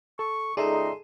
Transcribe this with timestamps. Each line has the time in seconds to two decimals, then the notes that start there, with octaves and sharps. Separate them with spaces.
0.19 A4 C#6
0.57 C#2 D#4 G#4 A4 D5 E5 A#5 C6